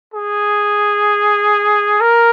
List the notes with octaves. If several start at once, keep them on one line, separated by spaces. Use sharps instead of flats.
G#4
A#4